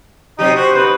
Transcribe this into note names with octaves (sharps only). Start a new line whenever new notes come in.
C3 F#3 D#4 G4
F#4 G4 C5
B3 D#4 B4